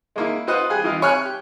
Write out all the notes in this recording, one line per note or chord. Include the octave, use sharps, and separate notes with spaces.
G#3 A#3 E4
F4 B4 C5 D#5 F#5
G4 G#4 G#5 F#6
E3 F4 D#5
C#5 G#5 F6 F#6
G4